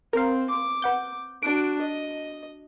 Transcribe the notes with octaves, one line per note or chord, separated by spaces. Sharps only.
C4 A#4 F5
D6
B4 F#5 G6
D4 F#4 D7
D#5